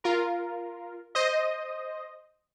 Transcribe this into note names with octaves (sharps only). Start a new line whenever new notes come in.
F4 A#4
C5 D#5